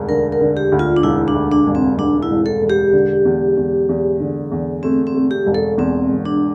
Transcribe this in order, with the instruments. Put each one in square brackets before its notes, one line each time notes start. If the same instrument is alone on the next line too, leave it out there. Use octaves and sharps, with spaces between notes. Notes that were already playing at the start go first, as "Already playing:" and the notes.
Already playing: [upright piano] E1 D2
[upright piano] D3 [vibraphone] A#4
[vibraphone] A#4
[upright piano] D3
[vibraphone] G4
[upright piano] D2
[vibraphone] F4
D4
[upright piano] E1 [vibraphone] E4
[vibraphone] D4
[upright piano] D2
[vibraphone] D4
[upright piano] E1
[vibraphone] C4
[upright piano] E1 [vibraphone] D4
[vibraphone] E4
[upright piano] E1
[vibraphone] A4
[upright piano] E1
[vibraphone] G4
[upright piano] D3
E2
E2
E2
D3
E2
[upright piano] A3 [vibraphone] C4
[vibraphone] C4
[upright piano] A3
[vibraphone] G4
[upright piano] E1
[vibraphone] A4
[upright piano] E2 [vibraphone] C4
[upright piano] E1
[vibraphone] D4